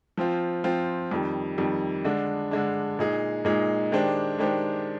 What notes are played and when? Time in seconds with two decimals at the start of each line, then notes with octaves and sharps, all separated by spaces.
0.17 F3 C4 F4
0.64 F3 C4 F4
1.11 F2 D#3 G3
1.58 F2 D#3 G3
2.04 D3 G#3 D4
2.51 D3 G#3 D4
2.99 A#2 G#3 D#4 G#4
3.45 A#2 G#3 D#4 G#4
3.92 D#3 G#3 D4 G4 C5
4.39 D#3 G#3 D4 G4 C5